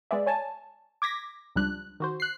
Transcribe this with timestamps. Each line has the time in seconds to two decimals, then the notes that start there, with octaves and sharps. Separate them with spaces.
0.11 G#3 B3 G#4 D5 E5
0.26 C#5 G#5 A5
1.02 D6 G#6 A#6 B6
1.56 C#2 F3 G3 D4 F#6
2.00 D#3 F#4 C5
2.20 F#6 C7